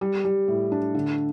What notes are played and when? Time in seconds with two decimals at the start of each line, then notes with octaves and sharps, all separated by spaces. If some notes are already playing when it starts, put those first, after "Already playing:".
0.01 G3
0.25 G3
0.48 A2
0.72 D4
0.95 D3